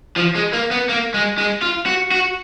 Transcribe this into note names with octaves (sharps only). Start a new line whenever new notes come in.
F3
G#3
A#3
B3
A#3
G#3
G#3
F4
F#4
F#4